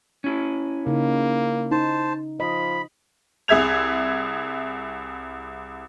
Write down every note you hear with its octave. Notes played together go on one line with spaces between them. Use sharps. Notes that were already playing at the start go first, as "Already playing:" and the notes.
C#4 E4
C#3 A#3 D#4
D#4 C5 A5
F3 D#5 B5
C2 G#4 E5 G#6 F7